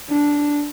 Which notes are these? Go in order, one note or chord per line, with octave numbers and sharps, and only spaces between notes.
D4